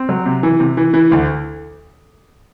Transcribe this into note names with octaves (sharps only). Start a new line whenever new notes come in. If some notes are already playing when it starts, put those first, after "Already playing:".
Already playing: C4
F#3
C3
E3
C3
E3
E3
D2